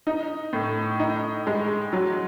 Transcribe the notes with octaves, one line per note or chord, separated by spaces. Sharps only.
D#4
A2
D#4
G#3
F#3